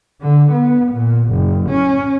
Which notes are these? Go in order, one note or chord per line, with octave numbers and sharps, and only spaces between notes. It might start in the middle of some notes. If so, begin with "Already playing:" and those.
D3
B3
A#2
F#1
C#4